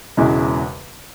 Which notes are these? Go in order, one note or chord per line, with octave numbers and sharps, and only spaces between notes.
E1 E2 C#3 E3 G#3